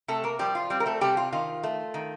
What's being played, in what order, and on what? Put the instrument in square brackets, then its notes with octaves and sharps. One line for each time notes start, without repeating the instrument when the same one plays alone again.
[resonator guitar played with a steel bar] C3 A3 A4
A#3 A#4
F3 G3 G4
F4
G3 C4 G4
A#4
A3 A4
C3 G3 G4
F4
D#3 F4
A3
D#3